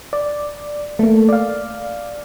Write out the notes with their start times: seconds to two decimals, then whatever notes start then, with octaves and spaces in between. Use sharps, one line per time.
0.13 D5
0.99 A3 A#3
1.29 D5 F5